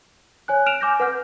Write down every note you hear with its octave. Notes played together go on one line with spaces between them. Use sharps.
C#5 G#5 F#6
F6 D7 E7 F7
G#5 D6 G6 A#6
B4 F#5 F6 G6